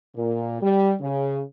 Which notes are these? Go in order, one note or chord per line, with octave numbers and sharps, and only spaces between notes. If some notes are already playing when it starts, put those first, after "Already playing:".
A#2
G3
C#3